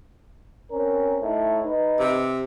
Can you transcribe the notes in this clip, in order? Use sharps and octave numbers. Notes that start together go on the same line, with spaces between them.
C4 C#4 A#4
A2 D#4
D#4 B4
C3